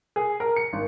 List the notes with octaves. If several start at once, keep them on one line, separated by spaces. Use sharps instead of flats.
G#4
A#4
C#7
G#1